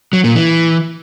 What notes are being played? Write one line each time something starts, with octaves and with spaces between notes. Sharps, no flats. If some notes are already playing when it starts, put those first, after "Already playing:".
F#3
A#2
E3